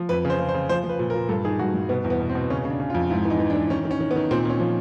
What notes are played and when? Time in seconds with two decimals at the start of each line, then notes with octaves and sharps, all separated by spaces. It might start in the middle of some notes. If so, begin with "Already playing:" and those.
Already playing: F3
0.09 F2 B4
0.25 C#3
0.30 C5
0.39 C#3
0.49 C5
0.54 C#3
0.69 F3 C5
0.84 F3
0.89 B4
0.99 A#2
1.10 A#4
1.15 A#2
1.29 G2 A4
1.45 D#3 G#4
1.59 G2 F#4
1.74 G2
1.89 B2 B3
2.05 E2
2.10 B3
2.20 B2
2.29 C4
2.35 B2
2.50 C#3 C#4
2.65 C#3
2.70 D4
2.80 C#3
2.90 F4
2.95 F2
3.10 G#2 E4
3.25 E3
3.30 D#4
3.39 E3
3.50 D4
3.54 E3
3.70 D#3 C#4
3.85 D#3
3.91 C#4
4.00 D#3
4.11 B3
4.16 D#3
4.31 A#2 C4
4.45 A#2 C#4
4.60 F3